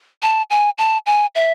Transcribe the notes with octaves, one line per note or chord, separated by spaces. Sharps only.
A5
G#5
A5
G#5
E5